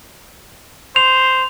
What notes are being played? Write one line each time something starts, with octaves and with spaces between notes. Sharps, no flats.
C5 F7